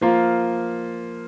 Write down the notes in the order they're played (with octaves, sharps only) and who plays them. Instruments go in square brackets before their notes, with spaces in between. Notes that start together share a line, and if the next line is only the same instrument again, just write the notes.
[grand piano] F3 A#3 F4